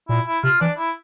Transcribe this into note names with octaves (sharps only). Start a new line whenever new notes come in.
A#2 E4
E4
C3 F4
E3 D4
E4